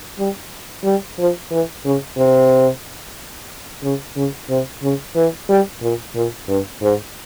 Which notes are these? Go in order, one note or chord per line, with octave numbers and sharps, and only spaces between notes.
G3
G3
F3
E3
C#3
C3
C#3
C#3
C3
C#3
E3
G3
A#2
A#2
G2
G#2